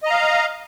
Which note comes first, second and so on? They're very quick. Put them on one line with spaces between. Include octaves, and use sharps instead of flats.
D#5 A#5 F5